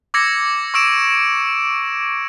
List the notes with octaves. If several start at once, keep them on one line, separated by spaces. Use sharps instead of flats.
D6 E6 G#6 A#6 C#7
C#6 E6 D7 E7